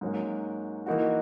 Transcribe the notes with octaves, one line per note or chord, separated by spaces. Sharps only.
G#2 F#3 A#3 C#4 F#4
E3 A#3 D#4 F#4